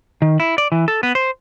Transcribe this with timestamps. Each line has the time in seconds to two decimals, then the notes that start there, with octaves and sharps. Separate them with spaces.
0.22 D#3
0.40 E4
0.58 D5
0.72 E3
0.88 A4
1.03 B3
1.15 C5